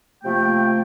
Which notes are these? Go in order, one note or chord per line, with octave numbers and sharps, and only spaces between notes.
C3 F3 A3 A#3 G5